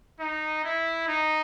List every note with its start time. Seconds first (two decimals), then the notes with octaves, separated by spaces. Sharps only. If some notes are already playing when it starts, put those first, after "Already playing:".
0.20 D#4
0.64 E4
1.08 D#4